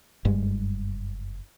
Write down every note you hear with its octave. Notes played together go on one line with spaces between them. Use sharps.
F#1 G2 G3 G#3